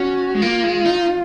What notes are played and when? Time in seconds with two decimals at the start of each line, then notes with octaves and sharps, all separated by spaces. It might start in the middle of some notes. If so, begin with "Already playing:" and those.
Already playing: C#4 F#4
0.35 G#3
0.42 A#3 F4
0.64 G#3
0.86 D#4